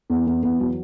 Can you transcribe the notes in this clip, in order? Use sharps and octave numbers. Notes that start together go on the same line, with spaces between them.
E2
E2
E2
F#3